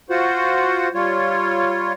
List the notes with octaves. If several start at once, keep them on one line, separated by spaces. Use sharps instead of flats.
F4 F#4 C5 F#5
G3 F4 C#5